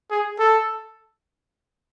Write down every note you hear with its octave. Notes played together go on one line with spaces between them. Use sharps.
G#4
A4